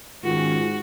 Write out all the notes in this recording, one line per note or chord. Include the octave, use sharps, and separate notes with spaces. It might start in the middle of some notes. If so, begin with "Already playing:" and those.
G#2 D#3 C#4 F4 F#4